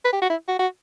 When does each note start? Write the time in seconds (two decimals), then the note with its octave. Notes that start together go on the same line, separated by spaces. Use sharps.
0.05 B4
0.13 G4
0.22 F#4
0.30 E4
0.48 F#4
0.59 F#4